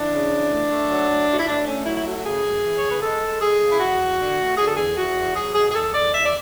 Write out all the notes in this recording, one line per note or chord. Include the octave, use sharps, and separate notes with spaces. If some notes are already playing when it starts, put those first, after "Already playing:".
Already playing: E3 D4
C#3
E3
A3
A3
F#3
A2
A2
F#4
E4
A2 D4
A3 C#4
F#3 E4
E4
A3 F#4
F#4
C#3 G#4
F#2
E3
C#3 C#5
B4
G#3 A4
G#3
G#3 G#4
C#3
E4
E2 F#4
E2
D3
A3
D3 G#4
A4
E2 G#4
E2 F#4
E2
F#3 G#4
B2 G#4
G#4
E2 A4
E2 D5
E2 E5
D5